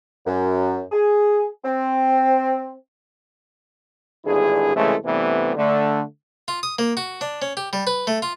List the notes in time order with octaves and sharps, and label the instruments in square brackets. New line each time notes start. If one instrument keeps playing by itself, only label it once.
[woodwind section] F#2
G#4
C4
[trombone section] G#1 G2 D3 E4 G#4
C2 C#3 E3 G#3 A3
G2 C3 E3 G3 A3 B3
D3 A3
[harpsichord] F4
D#6
A#3
F#4
D4
C#4
G4
G3
B4
A3
F4